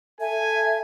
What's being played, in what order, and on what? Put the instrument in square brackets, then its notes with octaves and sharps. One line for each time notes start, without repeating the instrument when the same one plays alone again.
[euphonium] A4 [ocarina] E5 [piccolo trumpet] G#5